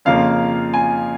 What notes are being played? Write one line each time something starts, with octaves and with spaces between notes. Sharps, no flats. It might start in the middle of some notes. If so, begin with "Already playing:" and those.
F2 C#3 F3 A#3 F5
G#5